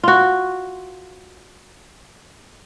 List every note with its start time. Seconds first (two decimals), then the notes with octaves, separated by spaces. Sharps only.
0.03 F4 F#4